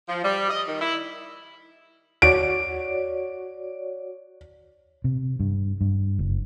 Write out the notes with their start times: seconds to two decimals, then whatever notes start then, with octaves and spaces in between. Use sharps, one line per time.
0.09 F3
0.24 G3
0.50 D#5
0.68 D#3
0.81 E4
2.22 F#4 C#5 D5 D7
5.04 C3
5.40 G2
5.81 G2
6.19 F#1